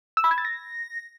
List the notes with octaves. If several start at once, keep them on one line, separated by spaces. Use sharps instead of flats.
E6
B5
G#6
A6
A#6